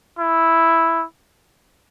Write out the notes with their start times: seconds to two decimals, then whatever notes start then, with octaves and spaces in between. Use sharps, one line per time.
0.19 E4